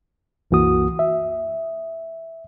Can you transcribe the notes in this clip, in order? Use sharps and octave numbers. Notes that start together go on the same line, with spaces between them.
C2 F#2 E3 A#3 F#4 D#6
E5